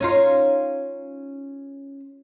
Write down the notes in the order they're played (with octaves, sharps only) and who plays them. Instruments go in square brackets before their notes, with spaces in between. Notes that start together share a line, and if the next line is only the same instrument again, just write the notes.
[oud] C#4 D#4 F4